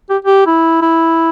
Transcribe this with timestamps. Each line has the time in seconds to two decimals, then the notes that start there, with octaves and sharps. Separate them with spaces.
0.10 G4
0.25 G4
0.46 E4
0.82 E4